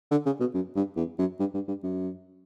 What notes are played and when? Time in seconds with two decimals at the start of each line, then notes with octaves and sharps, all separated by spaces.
0.11 D3
0.26 C#3
0.40 B2
0.54 F#2
0.76 G2
0.96 E2
1.18 F#2
1.39 G2
1.54 G2
1.68 G2
1.83 F#2